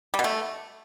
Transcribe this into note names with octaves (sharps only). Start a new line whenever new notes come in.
G3
B2
A3